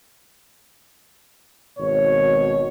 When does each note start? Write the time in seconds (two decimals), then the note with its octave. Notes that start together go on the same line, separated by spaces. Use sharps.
1.78 G#1 B2 C#5